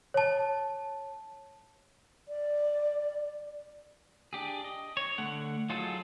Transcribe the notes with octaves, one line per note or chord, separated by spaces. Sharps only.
C#5 A5
D5
D4 G4 G#4
D#5
C#5
D3 A3 F#5
F#3 D#4 F4 G#4 A4